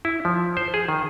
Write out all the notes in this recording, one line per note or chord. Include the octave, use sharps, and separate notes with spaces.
E4
F3
C5
G#4
D#3